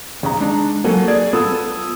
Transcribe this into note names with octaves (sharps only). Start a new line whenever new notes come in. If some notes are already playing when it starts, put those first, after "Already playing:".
D#2 C#3 A#5
G#3 D4 D#4
F#3 A#3 F#4 A4 G#5
G#4 D5 G#6
B3 F4 A4 D#6 E6